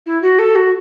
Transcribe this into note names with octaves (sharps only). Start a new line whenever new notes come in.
E4
F#4
A4
F#4